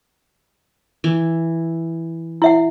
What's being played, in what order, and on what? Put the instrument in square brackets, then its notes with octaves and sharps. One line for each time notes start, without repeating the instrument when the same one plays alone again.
[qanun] E3
[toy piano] E4 E5 F#5